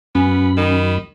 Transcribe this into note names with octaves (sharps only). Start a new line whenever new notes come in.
F#2 B3 C#4 B5
D#3